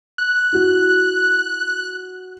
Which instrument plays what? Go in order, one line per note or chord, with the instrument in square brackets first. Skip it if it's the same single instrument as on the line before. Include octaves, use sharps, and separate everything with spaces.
[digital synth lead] F#6
[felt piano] E4 F#4